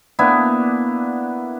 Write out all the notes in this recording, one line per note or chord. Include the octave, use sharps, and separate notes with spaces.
A#3 B3 D4 E4